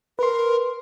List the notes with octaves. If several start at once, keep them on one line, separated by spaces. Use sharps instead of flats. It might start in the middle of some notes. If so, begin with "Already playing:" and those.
A#4 B4 C6